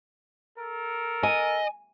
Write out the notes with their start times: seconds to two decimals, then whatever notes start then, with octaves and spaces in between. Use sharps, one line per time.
0.57 A4 A#4
1.23 D#5 G#5